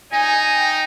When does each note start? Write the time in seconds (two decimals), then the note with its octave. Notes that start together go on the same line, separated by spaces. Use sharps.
0.13 D#4 G#5
0.55 G5